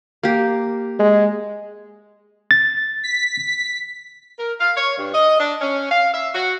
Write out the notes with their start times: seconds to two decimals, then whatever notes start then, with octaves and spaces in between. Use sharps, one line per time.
0.23 A#3 G4
0.99 G#3
2.51 A6
3.03 B6
4.39 A#4
4.60 F5
4.77 C#5
4.97 G2
5.14 D#5
5.39 D4
5.61 C#4
5.91 F5
6.13 E5
6.34 F#4